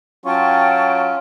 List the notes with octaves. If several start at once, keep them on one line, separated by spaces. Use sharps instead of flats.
F#3 C#4 F4 G5 A5 C#6